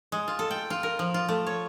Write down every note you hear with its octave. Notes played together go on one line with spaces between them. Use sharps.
G#3
F4
A4
G5
F4
A#4
F3
F4
A3
C#5